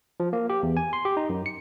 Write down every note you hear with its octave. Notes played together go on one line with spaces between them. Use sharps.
F3
A#3
G4
E2
G#5
C6
G4
D#4
F#2
C#7